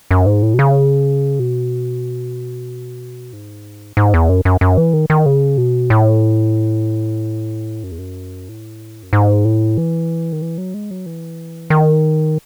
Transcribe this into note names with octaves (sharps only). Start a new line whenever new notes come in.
F#2
G#2
A2
B2
C#3
B2
G#2
G#2
E2
F#2
F#2
F#2
E3
D#3
D#3
C#3
B2
A2
F#2
E2
F#2
A2
F#2
G#2
A2
E3
D#3
E3
F#3
G#3
F#3
E3
D#3